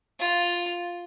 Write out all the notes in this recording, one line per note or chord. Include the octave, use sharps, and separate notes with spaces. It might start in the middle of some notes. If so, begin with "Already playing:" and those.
F4